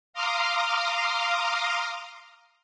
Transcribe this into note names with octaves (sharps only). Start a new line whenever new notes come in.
F5 A#5 C6 D6 D#6 F6